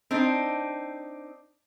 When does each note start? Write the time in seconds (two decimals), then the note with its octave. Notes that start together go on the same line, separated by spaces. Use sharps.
0.11 C4 D4 D#4